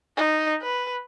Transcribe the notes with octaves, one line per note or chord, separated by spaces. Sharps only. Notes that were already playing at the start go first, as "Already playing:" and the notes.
D#4
B4